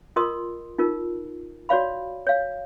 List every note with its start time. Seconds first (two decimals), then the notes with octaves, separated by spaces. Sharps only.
0.16 F4 A#4 D#5 C6 D#6
0.79 D#4 F4 A#4
1.69 F#4 C#5 D5 F5 B5
2.27 C#5 F5